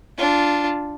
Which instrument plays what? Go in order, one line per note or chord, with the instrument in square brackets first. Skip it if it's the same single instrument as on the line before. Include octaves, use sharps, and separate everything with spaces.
[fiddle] D4 F4